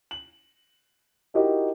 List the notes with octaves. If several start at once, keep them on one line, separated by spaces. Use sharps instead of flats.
F#7
D#4 E4 F#4 G4 A#4 D#5